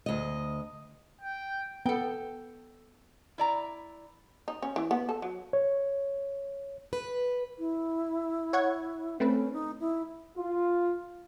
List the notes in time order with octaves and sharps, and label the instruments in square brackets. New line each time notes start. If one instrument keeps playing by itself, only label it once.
[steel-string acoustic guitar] D2 D#5
[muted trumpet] G5
[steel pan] B3 [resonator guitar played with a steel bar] A4 G5
[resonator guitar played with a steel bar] E4 D5 A#5
[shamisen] D#4
C#4
E3
B3
A4
F#3
[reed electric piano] C#5
[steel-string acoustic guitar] B4
[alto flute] E4
[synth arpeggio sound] C#5 F#5 G#6
[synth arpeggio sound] A3 C4 B4 [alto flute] C#4
[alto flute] D#4
E4
[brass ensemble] F4